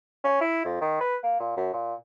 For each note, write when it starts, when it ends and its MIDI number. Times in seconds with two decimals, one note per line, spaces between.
0.24 0.39 61
0.41 0.64 64
0.65 0.77 41
0.81 0.98 51
1.01 1.16 71
1.23 1.37 58
1.40 1.56 46
1.57 1.72 42
1.73 1.94 46